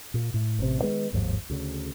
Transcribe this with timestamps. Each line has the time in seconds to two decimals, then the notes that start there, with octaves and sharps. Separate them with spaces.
0.14 A#2
0.34 A2
0.59 A1 C3
0.82 D#3 G#3 B3
1.13 G1 D#2 G#2 F3
1.50 D2 C#3